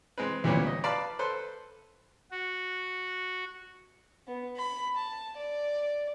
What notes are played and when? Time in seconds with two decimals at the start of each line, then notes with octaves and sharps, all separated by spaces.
0.18 G#3 C4 B4
0.44 D2 A#2 G3 B3 C#4
0.67 D#5
0.84 B4 D5 F5 A5 B5
1.19 A4 B4 C5
2.31 F#4
4.27 B3
4.57 B5
4.97 A5
5.37 D5